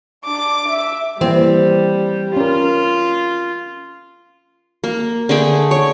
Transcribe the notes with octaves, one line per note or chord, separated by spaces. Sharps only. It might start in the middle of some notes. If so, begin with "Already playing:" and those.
D4 D6
E5
E3 G3 A#3 C4
C#4 F4 A#4
A#3
D3 A3 G#4 G5
C#5